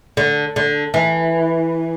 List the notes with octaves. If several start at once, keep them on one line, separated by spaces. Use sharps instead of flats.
D3
D3
E3